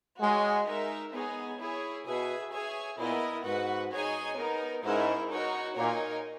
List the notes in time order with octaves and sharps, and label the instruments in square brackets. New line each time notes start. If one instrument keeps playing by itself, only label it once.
[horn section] G#3 [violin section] F#4 C#5 G#5
[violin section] D#4 A#4 E5
B3 D#4 G#4 C#5 G#5
E4 G#4 C#5
[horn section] B2 [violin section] G#4 B4 E5 G#5
[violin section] G#4 C#5 E5 G#5
[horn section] A#2 [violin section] B3 E4 A#4 D#5
[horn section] G#2 [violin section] F#4 B4 F#5
[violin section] D#4 G#4 C#5 G#5
B3 D#4 A#4
[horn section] G#2 [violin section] C#4 E4 A#4 E5
[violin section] D#4 F#4 A#4 C#5
[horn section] A#2 [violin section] D#4 A#4 C#5 G#5